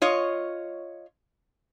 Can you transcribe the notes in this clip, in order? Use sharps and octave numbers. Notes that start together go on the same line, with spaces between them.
F4 C#5 D#5